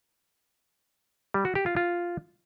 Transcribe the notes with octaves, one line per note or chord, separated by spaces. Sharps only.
G3
F#4
G4
F4
F4